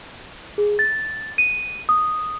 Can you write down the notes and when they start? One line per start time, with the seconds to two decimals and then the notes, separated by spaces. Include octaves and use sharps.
0.58 G#4
0.79 A6
1.38 D#7
1.89 D#6